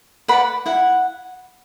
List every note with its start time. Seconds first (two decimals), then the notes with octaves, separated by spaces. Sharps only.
0.28 B4 D5 F#5 B5
0.66 E4 F#5